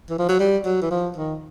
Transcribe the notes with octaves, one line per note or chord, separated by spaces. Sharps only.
E3
F3
F#3
G3
F#3
E3
F3
D#3